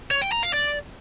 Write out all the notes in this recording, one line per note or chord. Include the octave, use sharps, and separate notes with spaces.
C#5
G5
A#5
F5
D5